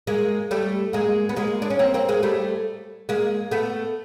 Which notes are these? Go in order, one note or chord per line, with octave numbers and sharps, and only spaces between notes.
G#3 A#3
G3 A3
G#3 A#3
B3
G#3 A#3
D4
C#4
A#3 C4
A#3 C4
G#3 A#3
G3 A3
G#3 A#3
A3 B3